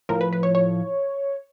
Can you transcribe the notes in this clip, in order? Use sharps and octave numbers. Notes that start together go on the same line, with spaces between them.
A2 F3 A#4
B4
B4
C#5
C#5